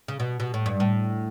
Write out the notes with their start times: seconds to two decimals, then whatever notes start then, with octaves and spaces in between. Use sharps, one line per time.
0.08 C#3
0.20 B2
0.40 B2
0.54 A2
0.66 G2
0.80 A2